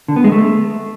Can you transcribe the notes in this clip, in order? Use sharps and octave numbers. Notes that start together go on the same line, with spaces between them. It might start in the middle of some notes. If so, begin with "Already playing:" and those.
D3
B3
G#3
A3